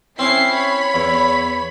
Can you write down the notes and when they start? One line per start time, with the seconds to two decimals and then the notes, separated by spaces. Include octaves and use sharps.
0.19 C4 C#4 E4 C7
0.54 C#5 B5
0.94 E2